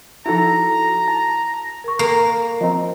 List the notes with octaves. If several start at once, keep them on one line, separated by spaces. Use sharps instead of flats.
F3 D#4 E4 F#4 A4 A#5
A5
A#4 C#6
A#3 A4 A#4
F3 C4 D#5 A#5